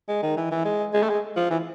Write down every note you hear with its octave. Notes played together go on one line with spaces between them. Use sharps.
G#3
D#3
E3
E3
G#3
G#3
A3
G#3
F3
E3